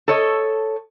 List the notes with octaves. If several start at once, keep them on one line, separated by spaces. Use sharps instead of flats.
A4 C#5 D#5